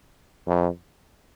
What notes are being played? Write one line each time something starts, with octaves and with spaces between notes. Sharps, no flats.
F2